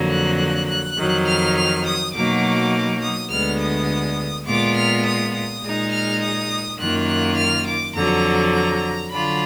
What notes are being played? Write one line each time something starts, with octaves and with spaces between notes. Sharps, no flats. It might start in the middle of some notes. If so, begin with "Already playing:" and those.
Already playing: F2 D3 F#3 A#3
F#6
F#6
F2 D#3 F#3
F6
F6
D#6
B2 F#3 A#3 D#4 D6
D#6
D2 D3 G#3 B3 F6
D#6
A#2 G#3 B3 F4 D6
F6
D#6
D#6
A#2 G#3 D#4
F6
D#6
F#2 D#3 A#3 F4 F#6
F#6
F6
D6
F2 D3 F#3 A#5
A#5
D3 F#3 D4 F4 B5